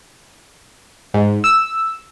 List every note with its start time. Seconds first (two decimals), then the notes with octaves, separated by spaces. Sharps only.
1.14 G#2
1.44 E6